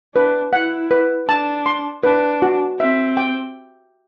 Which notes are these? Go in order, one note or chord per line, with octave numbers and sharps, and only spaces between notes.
D4 B4
E4 F#5
B4
D4 A5
C6
D4 B4
F#4
C4 E5
G5